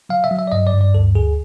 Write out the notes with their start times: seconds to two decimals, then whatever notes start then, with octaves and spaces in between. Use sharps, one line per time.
0.09 F#3 F5
0.24 E5
0.31 F#3
0.39 E5
0.47 D5
0.52 G2 D#5
0.67 D5
0.73 G2
0.81 D5
0.94 D2 A4
1.15 D2 G#4